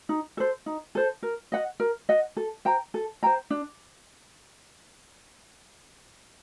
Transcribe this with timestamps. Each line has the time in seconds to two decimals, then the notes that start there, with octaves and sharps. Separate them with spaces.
0.09 D#4
0.37 A4 C5
0.66 D#4
0.95 A4 C5
1.23 A#4
1.52 D#5 F#5
1.80 A#4
2.09 D#5 F#5
2.37 A4
2.65 C5 G5 A#5
2.94 A4
3.23 C5 G5 A#5
3.50 D4